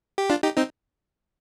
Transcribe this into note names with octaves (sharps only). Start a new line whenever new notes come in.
G4
D4 F4
D#4 G4
C4 D#4